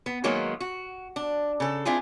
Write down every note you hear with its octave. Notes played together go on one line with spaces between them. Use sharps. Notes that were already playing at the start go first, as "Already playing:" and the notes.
B3
D#3 F#3 G#3 A#3 B3 D#4
F#4
D4
C#3 A4
C4 D4 E4 F4 G#4